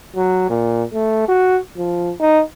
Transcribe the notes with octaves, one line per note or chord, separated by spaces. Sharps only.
F#3
A#2
A3
F#4
F3
D#4